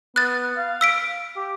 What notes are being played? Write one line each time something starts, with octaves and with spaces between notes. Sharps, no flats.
B3 F#6 A6
F5
E6 B6 D7
G4